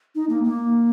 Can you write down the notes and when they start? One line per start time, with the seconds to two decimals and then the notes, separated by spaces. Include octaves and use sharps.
0.15 D#4
0.29 A#3
0.44 A#3